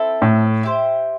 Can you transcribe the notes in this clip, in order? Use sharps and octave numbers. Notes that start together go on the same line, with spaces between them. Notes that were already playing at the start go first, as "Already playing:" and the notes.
Already playing: C4 E4 A4
A2
E4 G4 C5